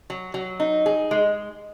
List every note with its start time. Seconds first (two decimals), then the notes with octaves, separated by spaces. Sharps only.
0.10 F#3
0.34 F#3
0.60 D#4
0.86 G#4
1.11 G#3